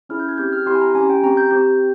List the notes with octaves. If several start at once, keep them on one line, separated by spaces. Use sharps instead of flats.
C#4 E4 G#4 F6
G6
G#6
C4 G4 G6
F6
C4 E4 G4 C6
G#5
A#5
C#4 G4 G#5
G5
C4 G4 A#5
G6
C4 G4 G6